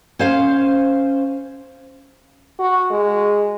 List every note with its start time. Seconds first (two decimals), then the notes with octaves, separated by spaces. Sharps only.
0.19 C#4 C5 F5
2.59 F#4
2.91 G#3